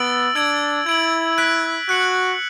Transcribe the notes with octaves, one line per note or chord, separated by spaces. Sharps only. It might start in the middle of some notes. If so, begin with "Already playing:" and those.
Already playing: B3 E6 A6 D7 F#7
D4 E6 G#6 D7 F#7
E4 G#6 D7 F#7
F#6 B6 D7 F#7
F#4 F#6 C#7 F#7